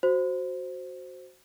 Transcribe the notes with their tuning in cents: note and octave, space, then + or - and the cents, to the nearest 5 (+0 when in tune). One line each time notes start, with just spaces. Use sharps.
F#4 +0 C5 +0